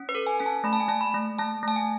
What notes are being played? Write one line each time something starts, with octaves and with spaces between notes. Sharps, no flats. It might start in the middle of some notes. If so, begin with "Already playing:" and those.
Already playing: C#4
B4
A4
G#5
C#4 G#5
A5
A3 B5
A5
G#5
A3 A5
B5
A3
A3 A5
A3 A5
G#5